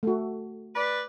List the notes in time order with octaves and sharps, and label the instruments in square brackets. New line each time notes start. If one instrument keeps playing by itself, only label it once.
[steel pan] A3 F#4
[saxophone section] B4 D5